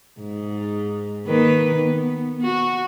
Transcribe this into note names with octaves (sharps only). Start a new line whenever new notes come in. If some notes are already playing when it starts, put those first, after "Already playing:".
G#2
D#3 A#3 B4
B3
F#4